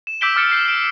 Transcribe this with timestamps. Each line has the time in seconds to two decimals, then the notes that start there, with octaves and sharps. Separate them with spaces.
0.07 E7
0.21 D6 E6 G6 B6 D7 G7
0.36 D6 F6 A6 C#7 D7 G7
0.52 G6 C7
0.68 D7